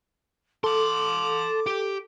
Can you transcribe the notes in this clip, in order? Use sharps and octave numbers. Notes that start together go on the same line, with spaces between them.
A4 A5 C6 D6
G4